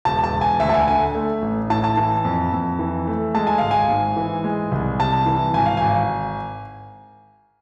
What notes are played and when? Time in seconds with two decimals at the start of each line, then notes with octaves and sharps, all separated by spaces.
0.05 E1 A5
0.24 A5
0.33 E1
0.41 G#5
0.60 D2 E5
0.69 A5
0.74 G#5
0.87 D3 G#5
1.15 A3
1.42 A1
1.70 A2 A5
1.84 A5
1.97 E3
2.25 F2
2.53 F2
2.79 E3
3.07 A3
3.35 G#3 A5
3.47 G#5
3.58 G#1 F5
3.71 G#5
3.89 G#2
4.17 E3
4.44 G#3
4.72 C2
4.99 C3 A5
5.26 E3
5.54 G#1 G#5
5.66 F5
5.77 G#1 G#5